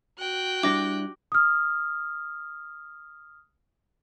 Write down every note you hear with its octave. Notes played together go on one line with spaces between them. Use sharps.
F#4 G5 F#6
G3 D4 E4 D6 A#6
D#6 F6